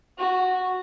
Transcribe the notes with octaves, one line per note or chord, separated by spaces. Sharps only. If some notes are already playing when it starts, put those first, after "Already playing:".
F#4